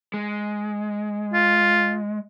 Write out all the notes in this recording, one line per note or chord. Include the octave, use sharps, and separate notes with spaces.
G#3
F4